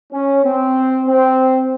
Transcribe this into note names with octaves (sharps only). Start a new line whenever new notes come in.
C#4
C4
C4